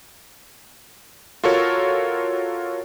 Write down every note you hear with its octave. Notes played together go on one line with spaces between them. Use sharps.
F4 F#4 A4 A#4 C#5